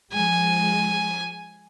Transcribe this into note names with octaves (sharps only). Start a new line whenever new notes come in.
F3 G#3 G#5